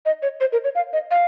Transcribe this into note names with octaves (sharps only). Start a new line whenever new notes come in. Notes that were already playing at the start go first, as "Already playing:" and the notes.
D#5
C#5
C5
A#4
C#5
F5
D#5
F5